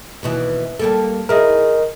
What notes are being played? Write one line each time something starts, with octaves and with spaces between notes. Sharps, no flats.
D#2 B2 E3
G3 A#3 A4
E4 G#4 A#4 D#5